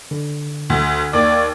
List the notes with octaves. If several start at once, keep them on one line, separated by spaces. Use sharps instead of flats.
D3
D2
D#2 D5